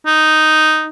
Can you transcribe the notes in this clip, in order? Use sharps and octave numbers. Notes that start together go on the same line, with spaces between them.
D#4